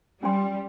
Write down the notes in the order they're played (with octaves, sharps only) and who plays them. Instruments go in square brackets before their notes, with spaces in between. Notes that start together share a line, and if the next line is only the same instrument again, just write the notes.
[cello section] G3 [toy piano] C#4 F4 C5 G5 C6